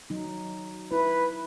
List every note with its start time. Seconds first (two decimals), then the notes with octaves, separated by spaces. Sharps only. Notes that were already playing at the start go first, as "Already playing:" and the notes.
0.10 F#3 D#4
0.92 E4 B4